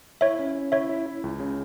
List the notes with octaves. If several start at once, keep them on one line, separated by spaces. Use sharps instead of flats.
E4 C#5 E5
C#4
C#4
E4 C#5 E5
E4
E4
C#2
C#3